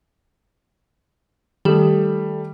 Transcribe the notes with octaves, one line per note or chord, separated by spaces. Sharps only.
D#3 G3 A3